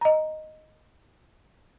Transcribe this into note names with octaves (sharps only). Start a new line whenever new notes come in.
D#5 A#5